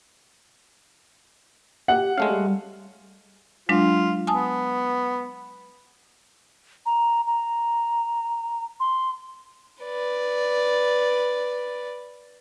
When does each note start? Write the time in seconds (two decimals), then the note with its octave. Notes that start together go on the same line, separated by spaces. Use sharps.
1.88 G4 F#5
2.18 G#3 A3 C#4 F5
2.30 G3
3.69 F#3 G#3 D4 F4
4.27 B3 G#5 A5 D#6
6.86 A#5
7.27 A#5
8.80 C6
9.83 B4 D5